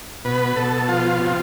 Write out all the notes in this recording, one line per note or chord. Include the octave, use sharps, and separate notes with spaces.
B2 B4
B2 A4
F3 F4
C3